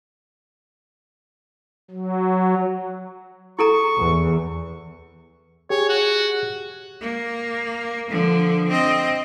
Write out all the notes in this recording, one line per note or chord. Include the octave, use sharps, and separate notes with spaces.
F#3
E4 A4 A#5 C#6
E2
G4 G#4 C#5
F#4
A#3
D3 F3
C4 D#5